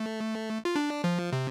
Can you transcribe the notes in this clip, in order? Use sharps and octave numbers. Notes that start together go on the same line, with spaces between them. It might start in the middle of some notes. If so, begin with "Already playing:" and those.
Already playing: A3
F4
D4
F3
C3